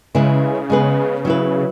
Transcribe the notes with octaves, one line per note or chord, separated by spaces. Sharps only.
C#3 G#3 E4 G#4 B4
G#3 B3 G#4 B4
F#3 E4 B4